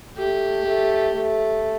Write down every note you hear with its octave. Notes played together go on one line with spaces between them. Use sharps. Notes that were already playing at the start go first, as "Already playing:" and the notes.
A3 G4
A3
A3